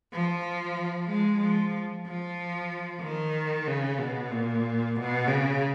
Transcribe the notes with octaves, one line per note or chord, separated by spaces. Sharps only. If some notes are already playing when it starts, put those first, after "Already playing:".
F3
G#3
F3
F3
D#3
C#3
B2
A#2
B2
C#3